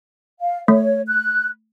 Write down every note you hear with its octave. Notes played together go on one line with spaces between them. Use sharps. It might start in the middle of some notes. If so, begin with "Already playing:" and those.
F5
A3 C#5
F#6